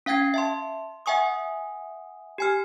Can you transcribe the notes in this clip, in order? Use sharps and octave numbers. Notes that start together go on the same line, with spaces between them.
C#4 F5 G5 G#6 C7
E5 A5 C6
E5 F#5 G#5 C#6 D#6
G4 G#5 F6